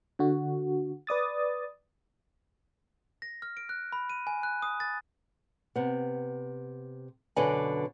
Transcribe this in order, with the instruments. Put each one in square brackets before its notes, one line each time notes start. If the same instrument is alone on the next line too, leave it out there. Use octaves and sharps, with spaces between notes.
[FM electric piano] D3 F#4
B4 D5 D#6 A6
[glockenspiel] A#6
F6
D7
F#6
B5
D#7
G#5
F#6
D#6
A6
[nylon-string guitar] C3 B3
F#2 B2 D3 D4 B4 G#5